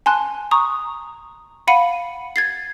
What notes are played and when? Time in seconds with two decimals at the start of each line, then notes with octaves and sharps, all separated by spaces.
0.06 G#5 A5 C6 F#6
0.51 A#5 C#6 D#6
1.67 F5 F#5 B5 C#7 D#7
2.36 G#6 A6 C7